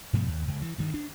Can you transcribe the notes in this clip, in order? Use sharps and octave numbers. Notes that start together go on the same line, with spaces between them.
G2 B2 F3 A3
D#2
C#2
E3
G2 D#3
D4